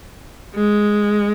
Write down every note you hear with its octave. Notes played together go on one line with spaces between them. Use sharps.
G#3